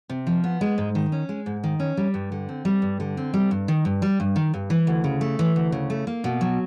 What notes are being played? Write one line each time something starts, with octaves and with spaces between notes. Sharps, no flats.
C3
F3
B3
G#3
G#2
D#3
C#4
G#3
G#2
D#3
C#4
G3
G2
D3
C4
G3
G2
D3
C4
G3
G2
D#3
G2
G3
G2
D#3
G2
E3
D2
C#3
A3
E3
D2
C#3
A3
A#3
B2
F#3